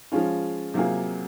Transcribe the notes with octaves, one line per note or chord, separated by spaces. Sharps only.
F3 G#3 C#4 F4
C3 F#3 A#3 F4 G#4